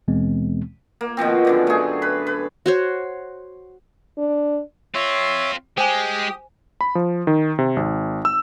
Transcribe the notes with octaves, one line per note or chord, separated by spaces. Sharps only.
D#2 B2 E3 G#3 B3 C4
A#3
B2 D#3 F3 C4
F#2 D3 D5
A3 G#4
B4
B4
F#4 C5 C#5
D4
C4 F4 C#5 E5 C6
G#3 G4 C5 G#5 D#6
B5
F3
D#3
C3
G#1
E6